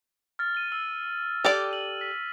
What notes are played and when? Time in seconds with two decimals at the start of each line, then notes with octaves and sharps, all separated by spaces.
0.39 F6 A6
0.55 D#7 G7
0.72 E6
1.44 G4 A4 D5
1.71 D#7 F#7
2.01 B6